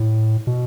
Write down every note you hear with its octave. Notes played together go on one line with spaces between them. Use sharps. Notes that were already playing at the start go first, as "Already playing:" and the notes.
Already playing: A2
B2